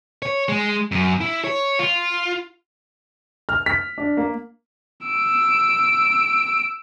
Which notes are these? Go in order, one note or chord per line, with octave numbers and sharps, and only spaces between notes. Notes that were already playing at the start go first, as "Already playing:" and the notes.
C#5
G#3
F#2
E4
C#5
F4
F6
B6
D4
A#3
E6 D7